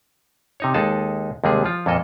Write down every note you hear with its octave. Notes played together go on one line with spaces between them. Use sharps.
C3 D#4 C#5
D#2 G#3 D#4 G#4 A4 A5
D#2 C3 G3 G#3 G#4
F3 F4
F2 A#2 A#3 A4 D#5